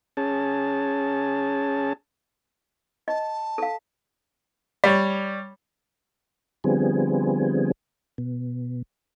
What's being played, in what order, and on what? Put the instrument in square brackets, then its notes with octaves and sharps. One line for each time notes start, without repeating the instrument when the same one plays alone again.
[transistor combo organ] C#4 G#4 A5
[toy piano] D#5 [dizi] A5
[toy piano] A4 F5
[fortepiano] G3 C#5
[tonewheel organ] D3 F3 G3 B3 C4 G#4
B2